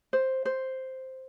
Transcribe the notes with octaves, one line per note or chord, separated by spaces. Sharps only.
C5
C5